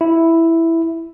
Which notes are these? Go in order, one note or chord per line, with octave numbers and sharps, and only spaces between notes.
E4